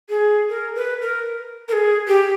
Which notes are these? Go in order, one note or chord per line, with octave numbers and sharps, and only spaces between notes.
G#4
A#4
B4
A#4
A#4
G#4
G4